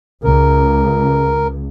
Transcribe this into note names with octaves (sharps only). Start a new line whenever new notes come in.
C#2 A#4